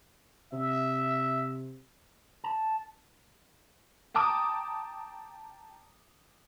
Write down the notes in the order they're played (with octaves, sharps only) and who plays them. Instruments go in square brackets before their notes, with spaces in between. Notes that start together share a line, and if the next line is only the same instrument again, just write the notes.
[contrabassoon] C3 [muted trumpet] E5
[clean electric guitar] A5
[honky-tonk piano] G5 A5 A#5 D6 D#6